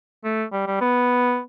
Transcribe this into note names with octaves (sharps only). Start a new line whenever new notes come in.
A3
G3
G3
B3